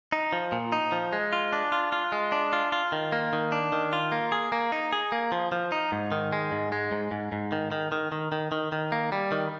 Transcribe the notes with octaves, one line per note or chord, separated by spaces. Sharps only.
D#4
F3
A#2
D#4
F3
G#3
F4
D4
F4
F4
G#3
D4
F4
F4
D#3
A#3
D#3
D4
D#3
F4
A#3
G#4
A#3
D#4
G#4
A#3
F3
F3
D#4
G#2
D#3
G#3
G#2
G#3
G#2
G#2
G#2
D#3
D#3
D#3
D#3
D#3
D#3
D#3
A#3
G3
D#3